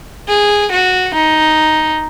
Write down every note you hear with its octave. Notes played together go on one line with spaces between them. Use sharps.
G#4
F#4
D#4